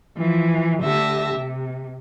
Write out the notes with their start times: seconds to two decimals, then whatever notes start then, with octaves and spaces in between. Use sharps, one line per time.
0.17 E3 F3
0.82 D2 D3 G4 E5 A5 A#6
1.35 C3